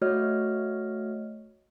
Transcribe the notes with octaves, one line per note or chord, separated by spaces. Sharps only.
A3 F#4 C#5 D#5 F6